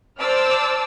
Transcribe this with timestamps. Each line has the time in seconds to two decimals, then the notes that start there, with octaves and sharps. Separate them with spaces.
0.19 C5 D5 A5 D6 E6 F6